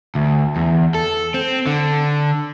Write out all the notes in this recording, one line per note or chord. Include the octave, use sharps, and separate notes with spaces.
D2
E2
A4
C4
D3